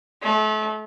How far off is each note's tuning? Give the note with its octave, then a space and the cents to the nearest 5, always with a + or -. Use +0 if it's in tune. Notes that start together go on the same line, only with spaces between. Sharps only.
A3 -35